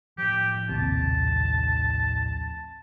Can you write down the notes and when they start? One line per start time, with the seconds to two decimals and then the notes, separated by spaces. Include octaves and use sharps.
0.18 A2 F3 G4
0.69 A#1 D#2 C3 A5